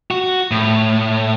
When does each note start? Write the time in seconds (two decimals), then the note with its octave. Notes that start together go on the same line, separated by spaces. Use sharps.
0.11 F#4
0.51 A2